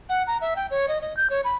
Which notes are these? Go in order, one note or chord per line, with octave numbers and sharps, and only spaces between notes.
F#5
A#5
E5
G5
C#5
D#5
D#5
G6
C#5
B5